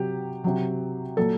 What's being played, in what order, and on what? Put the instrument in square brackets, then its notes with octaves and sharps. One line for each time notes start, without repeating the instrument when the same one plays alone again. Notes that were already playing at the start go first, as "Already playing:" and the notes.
Already playing: [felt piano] C3 F#3 G4
C3 F#3
A#2 F#3 A4